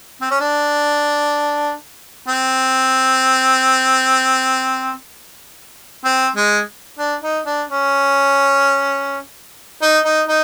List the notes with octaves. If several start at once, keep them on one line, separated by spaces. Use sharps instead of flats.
C4
C#4
D4
C4
C4
G#3
D4
D#4
D4
C#4
D#4
D#4
D#4